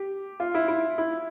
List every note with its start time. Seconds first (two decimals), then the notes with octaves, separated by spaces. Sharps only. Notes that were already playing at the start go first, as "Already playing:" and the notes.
Already playing: G4
0.40 F4
0.54 E4
0.68 E4
0.98 E4